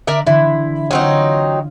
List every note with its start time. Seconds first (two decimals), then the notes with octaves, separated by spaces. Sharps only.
0.07 D3 A#4 D5 E5
0.27 D3 E3 E4 C6
0.91 F#3 C4 D#4 F4 C#5 F5